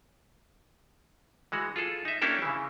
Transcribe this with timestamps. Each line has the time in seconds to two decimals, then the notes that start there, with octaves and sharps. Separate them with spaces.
1.52 E3 G#3 F#4
1.76 F4 G#4 A4
2.05 D#4 E5
2.22 A#3 C#4 D4 E4 G4 A4
2.42 C#3 E3